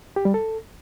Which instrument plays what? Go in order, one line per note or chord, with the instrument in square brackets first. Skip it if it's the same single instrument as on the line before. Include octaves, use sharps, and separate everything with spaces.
[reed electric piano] G4
G3
A4